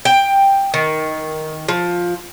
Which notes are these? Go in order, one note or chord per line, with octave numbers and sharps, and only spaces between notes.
G5
D#3
F3